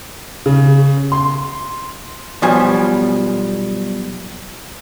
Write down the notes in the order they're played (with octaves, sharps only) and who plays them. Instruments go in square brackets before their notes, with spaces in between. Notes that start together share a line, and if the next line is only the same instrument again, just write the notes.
[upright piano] C#3
C6
[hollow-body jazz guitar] B1 B2 F3 G3 G#5